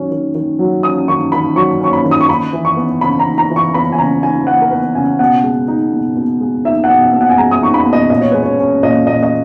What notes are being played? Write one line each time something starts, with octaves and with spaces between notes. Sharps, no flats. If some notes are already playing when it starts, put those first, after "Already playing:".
Already playing: D#3 F#3 C#4
D#3
D#3
F#3
C#4 D#6
D#3 C#6
D#3 B5
F#3 C#6
C#4 C#6
B5
D#3
D#6
C#6
D#4 B5
E3
C#6
B3
C#3 B5
A#5
D#4
A#5
E3
C#6
B3 B5
G#5
C#3 A#5
D#4 G#5
E3 F#5
A#4
B3 B4
C#3 G#5
B2 F#5
G#3
D#4
B2
B2
G#3
D#4 E5
F#5
B2
F#5
B2
F#5
G#5
G#3 A#5
D#6
D#4 C#6
B5
B2
D#5
A#2 D#5
C#5
G#3 B4
C#5
C#4
A#2 D#5
A#2 D#5
D#5